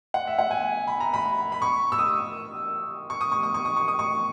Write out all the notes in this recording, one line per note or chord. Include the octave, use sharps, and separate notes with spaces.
F#5
E5
F#5
G#5
B5
A#5
B5
B5
C#6
E6
D#6
C#6
D#6
C#6
D#6
C#6
D#6
C#6
D#6
C#6